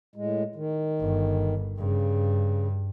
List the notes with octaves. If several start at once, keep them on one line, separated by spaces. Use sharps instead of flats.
A2 G#3
D#3
G1
G2 C#3